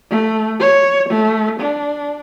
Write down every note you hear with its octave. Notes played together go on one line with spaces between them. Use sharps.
A3
C#5
A3
D4